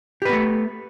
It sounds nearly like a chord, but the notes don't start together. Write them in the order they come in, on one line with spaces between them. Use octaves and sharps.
G4 B4 B3 A3